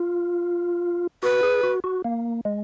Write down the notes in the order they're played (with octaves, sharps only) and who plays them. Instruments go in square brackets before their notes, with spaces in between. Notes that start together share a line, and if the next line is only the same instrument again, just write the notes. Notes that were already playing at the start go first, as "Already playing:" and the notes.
Already playing: [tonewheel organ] F4
[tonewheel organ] F#4 [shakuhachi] B4
[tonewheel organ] G#4
F#4
F#4
A#3
G#3